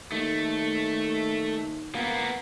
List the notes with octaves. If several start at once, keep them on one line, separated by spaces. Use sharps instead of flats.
D#2 A3
A#3 B3